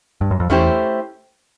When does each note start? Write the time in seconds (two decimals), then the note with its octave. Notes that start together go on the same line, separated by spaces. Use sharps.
0.21 G2
0.31 F#2
0.40 F2
0.50 E2 A3 C#4 E4 G4 C5